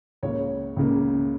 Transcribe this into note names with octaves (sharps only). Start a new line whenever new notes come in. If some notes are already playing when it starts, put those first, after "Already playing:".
C#2 C#3 A#3 C#5
C#2 C#3 A#3